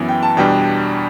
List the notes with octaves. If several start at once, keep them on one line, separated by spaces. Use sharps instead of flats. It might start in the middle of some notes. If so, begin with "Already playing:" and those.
Already playing: F#2 E3 B3
G5
A5
E2 B2 G3 D4 G5